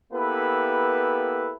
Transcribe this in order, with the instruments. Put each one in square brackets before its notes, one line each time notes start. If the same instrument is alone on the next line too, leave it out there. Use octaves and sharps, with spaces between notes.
[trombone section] A#3 B3 E4 G4 A4 B4